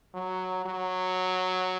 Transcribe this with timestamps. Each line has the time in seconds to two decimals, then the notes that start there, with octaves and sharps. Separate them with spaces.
0.14 F#3
0.66 F#3